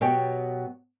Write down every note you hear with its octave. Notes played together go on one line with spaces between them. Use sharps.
B2 F#3 B3 G4 C#5 G5